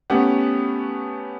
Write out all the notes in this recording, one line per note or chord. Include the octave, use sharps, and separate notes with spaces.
A3 B3 C#4 G4 F#5